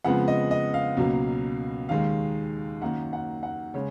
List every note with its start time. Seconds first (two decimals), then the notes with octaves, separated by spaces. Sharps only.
0.04 F2 C#3 F3 G#3 B3 F#5
0.28 D#5
0.51 D#5
0.74 F5
0.97 C#2 B2 F#3 A#3
1.89 D#2 D#3 G#3 F5
2.82 F#2 D#3 A#3 F#5
3.13 F#5
3.43 F#5
3.74 C#3 G#3 C#5